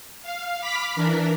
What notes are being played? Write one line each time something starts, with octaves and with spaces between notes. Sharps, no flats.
F5
B5 D6 F6 B6
E3 D4 A#4